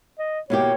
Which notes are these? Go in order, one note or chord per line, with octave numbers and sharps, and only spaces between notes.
D#5
B2 A#3 E4 G4 C#5